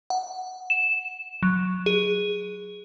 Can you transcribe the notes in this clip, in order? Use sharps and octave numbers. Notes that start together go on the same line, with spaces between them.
F#5
E7
F#3
G#4